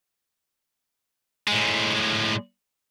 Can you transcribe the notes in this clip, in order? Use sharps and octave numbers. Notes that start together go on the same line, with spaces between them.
A2 G#3